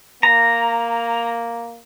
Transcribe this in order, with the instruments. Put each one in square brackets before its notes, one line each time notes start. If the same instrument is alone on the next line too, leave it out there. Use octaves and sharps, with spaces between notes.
[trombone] A#3 [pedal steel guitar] A#5